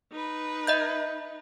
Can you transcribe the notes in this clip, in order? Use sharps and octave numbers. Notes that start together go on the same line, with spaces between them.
D#4 B4
D#5 E5 G6